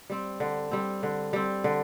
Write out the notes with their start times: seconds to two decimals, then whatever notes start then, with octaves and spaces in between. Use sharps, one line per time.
0.10 G3 C4
0.40 D3
0.71 G3 C4
1.03 D3
1.33 G3 C4
1.64 D3